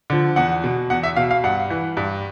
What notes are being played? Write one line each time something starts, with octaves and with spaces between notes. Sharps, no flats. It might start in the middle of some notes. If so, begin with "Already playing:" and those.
D3 F3
E2 F#5
B2
E2 F#5
E5
B2 F5
F5
G2 F#5
E3
G2